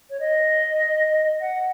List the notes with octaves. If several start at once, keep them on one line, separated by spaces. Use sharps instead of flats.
C#5
D#5
F#5